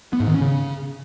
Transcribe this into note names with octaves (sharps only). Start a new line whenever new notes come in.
B3
G#2
D#3
C#4
C#3